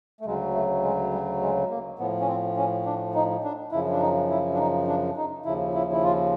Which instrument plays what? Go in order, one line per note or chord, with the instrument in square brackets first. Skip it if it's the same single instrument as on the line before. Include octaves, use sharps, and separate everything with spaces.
[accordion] A3
D2 C#3 F#3 G#3
A3
G#3
G3
G#3
A#3
A2 F3 B3
C#4
C4
C#4
D4
D#4
D4
F#2 C#3 F3 E4
D4
D#4
E4
D4
D#4
D4
D#4
D#2 C#3 F3 E4
E4
E4
F4